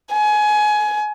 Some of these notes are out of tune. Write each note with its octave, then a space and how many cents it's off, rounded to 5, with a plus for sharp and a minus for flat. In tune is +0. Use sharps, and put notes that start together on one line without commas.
G#5 +25